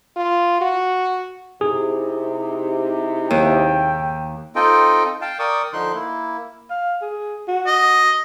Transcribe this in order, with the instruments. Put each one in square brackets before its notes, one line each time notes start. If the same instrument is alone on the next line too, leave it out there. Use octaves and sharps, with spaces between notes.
[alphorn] F4
F#4
[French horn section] C3 D#4 E4 [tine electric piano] G#4
[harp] D#2 [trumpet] G5
[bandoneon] C4 D#4 F4 A4 D#5 G5
F5 G5 A5
A#4 D5 G5 C#6 D#6
D3 F3 D#4 C6 F#6
A#3 E4
[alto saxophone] F5
G#4
F#4
[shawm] D#5